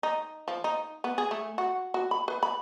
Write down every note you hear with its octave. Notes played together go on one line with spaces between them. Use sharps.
D#4
F3
D#4
B3
G#4
A3
F#4
F#4
B5
B4
B5